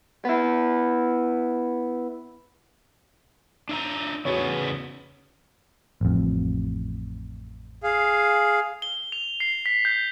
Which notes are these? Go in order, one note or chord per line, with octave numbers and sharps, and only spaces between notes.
B3 E4
D4 E5 A#5
E2 C#3 B3 F#4 C#5
A1 F2
G#4 F5
G7
F7
C7
B6
G6